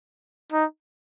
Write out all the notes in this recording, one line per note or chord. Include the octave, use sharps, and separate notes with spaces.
D#4